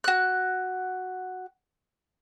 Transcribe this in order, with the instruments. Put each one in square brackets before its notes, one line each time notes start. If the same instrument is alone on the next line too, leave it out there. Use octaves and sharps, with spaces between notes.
[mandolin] F#4 F#6